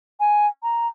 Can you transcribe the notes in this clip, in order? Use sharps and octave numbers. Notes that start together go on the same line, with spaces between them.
G#5
A#5